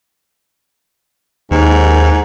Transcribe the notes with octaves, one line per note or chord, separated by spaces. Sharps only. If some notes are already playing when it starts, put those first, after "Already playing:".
D#2 G#2